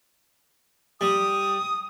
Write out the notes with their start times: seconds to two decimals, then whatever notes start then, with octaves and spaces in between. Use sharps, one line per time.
1.01 G3 D#6